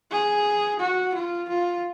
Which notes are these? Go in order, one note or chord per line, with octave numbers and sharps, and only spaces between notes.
G#4
F#4
F4
F4